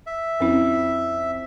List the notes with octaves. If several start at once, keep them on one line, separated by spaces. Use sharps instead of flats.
E5
F2 C#4 E4